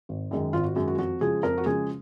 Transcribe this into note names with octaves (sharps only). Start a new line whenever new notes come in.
G#1
F#2 D#3 G#3
G#1 F4
F#4
F#2 D#3 G#3
F#4
F2 F#4
C#3 F3 G#3 G#4
F2 A#4
F#4
C#3 F3 G#3 G#4